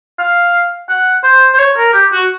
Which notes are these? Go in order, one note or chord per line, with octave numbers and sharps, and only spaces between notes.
F5
F#5
C5
C5
C#5
A#4
G4
F#4